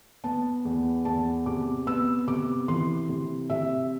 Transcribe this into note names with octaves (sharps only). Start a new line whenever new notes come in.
B3 A5
E2
E2 A5
C3 D6
B3 E6
C3 D6
E3 C6
C3
C3 E5